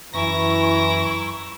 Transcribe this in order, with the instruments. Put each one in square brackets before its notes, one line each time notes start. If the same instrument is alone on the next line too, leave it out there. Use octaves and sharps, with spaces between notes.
[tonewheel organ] F#2 A#6 [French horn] E3 [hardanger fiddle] E4 A#5 [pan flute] C#6